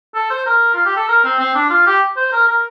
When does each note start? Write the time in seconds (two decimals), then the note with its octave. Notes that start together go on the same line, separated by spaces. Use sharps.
0.15 A4
0.30 C5
0.46 A#4
0.74 F4
0.85 G4
0.96 A4
1.08 A#4
1.24 C4
1.39 C4
1.55 D4
1.70 F4
1.86 G4
2.17 C5
2.32 A#4
2.48 A#4